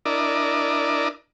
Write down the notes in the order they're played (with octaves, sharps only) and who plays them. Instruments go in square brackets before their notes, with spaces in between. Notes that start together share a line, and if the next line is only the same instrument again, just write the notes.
[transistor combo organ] D4 E4 A#4 D5 D#5